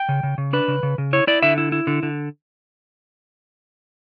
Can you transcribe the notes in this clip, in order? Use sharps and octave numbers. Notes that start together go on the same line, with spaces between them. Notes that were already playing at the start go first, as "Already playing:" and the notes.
Already playing: G5
C#3
C#3
C#3
D4 B4
C#3
C#3
C#3
E4 C#5
E4 D5
D3 E5
E4
E4
D3
D3